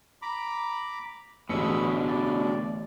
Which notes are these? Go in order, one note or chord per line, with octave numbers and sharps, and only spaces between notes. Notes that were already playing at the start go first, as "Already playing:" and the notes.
A#5 B5 D6
A1 B2 D3 G#4 B5 E6 C#7
D5